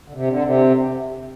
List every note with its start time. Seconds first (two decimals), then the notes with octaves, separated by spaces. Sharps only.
0.08 D3
0.13 C3
0.28 D3
0.42 C3